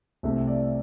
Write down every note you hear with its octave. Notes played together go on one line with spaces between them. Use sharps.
C2 C3 A3 E5
D5